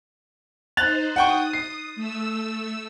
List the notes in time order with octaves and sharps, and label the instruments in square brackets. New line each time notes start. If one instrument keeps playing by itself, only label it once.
[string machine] D#4 C5 [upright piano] F#6 A6 F7
[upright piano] F#5 G5 C#6 [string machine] D#6
[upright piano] C7
[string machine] A3 E6